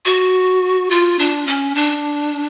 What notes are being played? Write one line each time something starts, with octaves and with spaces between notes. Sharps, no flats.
F#4
F4
D4
C#4
D4